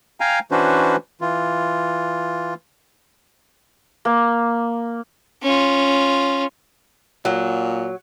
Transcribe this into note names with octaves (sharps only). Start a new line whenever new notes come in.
F5 G5 G#5 A#5
E3 C#4 D4 F#4 B4 C5
E3 F4
A#3
C#4 F4
A#2 F#3